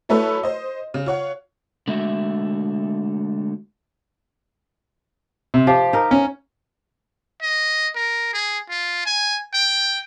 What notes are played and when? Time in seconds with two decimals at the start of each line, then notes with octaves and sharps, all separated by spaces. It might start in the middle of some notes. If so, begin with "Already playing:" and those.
0.09 F#3 A3 E4 A4 B4 C#5
0.43 C5 D#5
0.94 C#3
1.06 F4 C#5 F#5
1.88 D3 G#3 A3 F#4 E5
5.54 C3
5.67 F3 G4
5.93 D#4 A#4
6.11 C#4
7.42 D#5
7.95 A#4
8.34 G#4
8.69 F4
9.06 G#5
9.54 G5